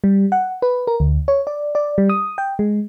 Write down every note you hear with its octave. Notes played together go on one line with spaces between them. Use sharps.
G3
F#5
B4
A#4
D2
C#5
D5
D5
G3
D#6
G5
G#3